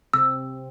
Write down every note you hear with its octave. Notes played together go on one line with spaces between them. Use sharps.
C3 C4 E6